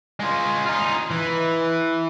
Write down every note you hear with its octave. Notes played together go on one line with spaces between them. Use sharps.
G#3 F4
D#4 F4
E3